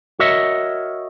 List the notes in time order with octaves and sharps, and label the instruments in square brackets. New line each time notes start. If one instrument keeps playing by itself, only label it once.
[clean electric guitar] F#4 A#4 C#5 D#5 E5